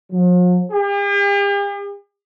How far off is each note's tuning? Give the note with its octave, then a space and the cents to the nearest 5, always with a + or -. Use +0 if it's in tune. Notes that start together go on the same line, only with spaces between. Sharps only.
F3 +45
G4 +45